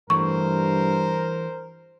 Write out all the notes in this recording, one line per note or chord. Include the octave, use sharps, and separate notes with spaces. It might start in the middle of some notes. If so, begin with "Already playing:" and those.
G2 E3 A3 A#4 C5 D5 C#6